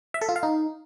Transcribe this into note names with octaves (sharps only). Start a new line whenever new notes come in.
E5
A4
F4
F5
D#4